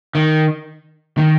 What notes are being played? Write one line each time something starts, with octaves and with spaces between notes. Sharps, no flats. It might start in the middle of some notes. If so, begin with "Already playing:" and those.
D#3
D#3